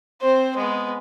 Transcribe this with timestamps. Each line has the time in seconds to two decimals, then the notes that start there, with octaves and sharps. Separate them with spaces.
0.21 C4 C5
0.56 G#3 B3